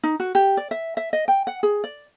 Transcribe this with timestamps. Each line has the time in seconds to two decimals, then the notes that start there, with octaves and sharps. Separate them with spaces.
0.03 D#4
0.20 F#4
0.35 G4
0.57 D5
0.71 E5
0.97 E5
1.13 D#5
1.28 G5
1.47 F#5
1.63 G#4
1.84 D5